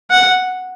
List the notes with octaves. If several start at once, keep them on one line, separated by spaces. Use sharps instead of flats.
F#5